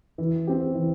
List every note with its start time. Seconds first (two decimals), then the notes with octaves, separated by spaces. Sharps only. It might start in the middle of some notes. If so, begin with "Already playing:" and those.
0.18 E3
0.47 C4 G4
0.75 E3